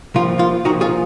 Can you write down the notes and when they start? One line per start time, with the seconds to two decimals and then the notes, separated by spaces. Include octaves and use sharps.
0.15 C2 A#2 F3 F4
0.39 F4
0.65 C2 A#2 F3 D#4 F#4
0.81 F4 G#4